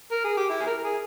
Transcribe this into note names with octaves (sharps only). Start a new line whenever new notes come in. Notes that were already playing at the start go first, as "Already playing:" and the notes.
A#4
G#4
G4
E4
G#4
A#4
A#4
G#4